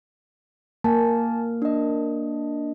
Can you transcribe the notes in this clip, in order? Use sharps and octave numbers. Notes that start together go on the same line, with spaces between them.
A#3 G#5 A5
D4 D#5